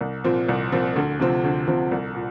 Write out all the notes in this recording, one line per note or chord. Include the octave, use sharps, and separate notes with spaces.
C2
A#2 F3 C4
C2
A#2 F3 C4
D2
C3 F3 C4
D2
C3 F3 C4
C2
A#2